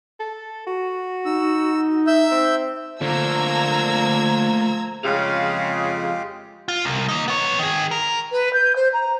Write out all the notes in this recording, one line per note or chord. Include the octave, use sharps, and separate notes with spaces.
A4
F#4
D#4 E6
E5 E6 G6
C4
D3 F3 A3 A#3 A#5 E6 G#6
F2 C#3 G#3 F4 G4 F5
F4
C2
A#3 D#4
B3 C#5
D#3 G#4
A#4
B4
G6
C5
A#5